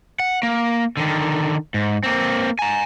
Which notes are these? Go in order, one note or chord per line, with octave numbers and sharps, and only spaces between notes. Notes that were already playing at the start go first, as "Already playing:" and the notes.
F#5
A#3
D3 D#3
G#2
A#3 C4
G#5 A#5